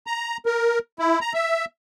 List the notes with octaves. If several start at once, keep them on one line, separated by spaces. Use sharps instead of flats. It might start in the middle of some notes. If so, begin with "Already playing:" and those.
A#5
A#4
E4
A#5
E5